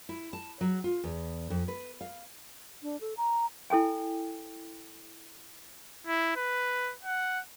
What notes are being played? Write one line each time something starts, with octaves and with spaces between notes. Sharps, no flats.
E4
A5
F#3
F4
E2
F2
B4
F5
D4
A4
A#5
E4 A4 G5 G#5
E4
B4
F#5